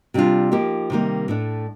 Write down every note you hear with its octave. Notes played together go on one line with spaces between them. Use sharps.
C3 G3 D4 F4
F3 A#3 D#4 G4
C3 D#3 G3 A#3
A2 A3 D4